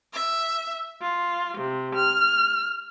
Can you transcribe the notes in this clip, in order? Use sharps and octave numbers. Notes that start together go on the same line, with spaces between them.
E5
F4
C3
F6